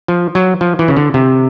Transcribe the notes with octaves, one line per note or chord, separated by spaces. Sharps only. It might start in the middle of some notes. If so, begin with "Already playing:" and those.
F3
F#3
F3
E3
C#3
D3
C3